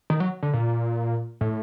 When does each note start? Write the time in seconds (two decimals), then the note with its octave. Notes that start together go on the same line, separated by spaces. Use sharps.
0.10 D#3
0.20 F#3
0.43 D3
0.54 A#2
1.41 A2